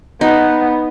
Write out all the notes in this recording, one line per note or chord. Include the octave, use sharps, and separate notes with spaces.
B3 D#4